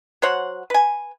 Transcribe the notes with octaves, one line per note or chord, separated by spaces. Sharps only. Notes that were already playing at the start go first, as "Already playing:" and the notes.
F#3 C5 C#5 F#5
B4 G#5